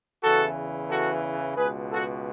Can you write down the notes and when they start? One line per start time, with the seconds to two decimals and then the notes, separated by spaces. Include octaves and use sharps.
0.24 E2 C#3 E3 F#4 A4
0.90 F#4 A4
1.58 C#2 B2 G#4 B4
1.92 F#4 A4